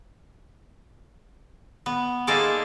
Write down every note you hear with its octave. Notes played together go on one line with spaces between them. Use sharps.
B3
A#3 D#4 G#4 A4 C5 D5